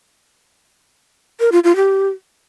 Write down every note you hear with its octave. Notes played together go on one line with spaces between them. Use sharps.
A#4
F4
F4
G4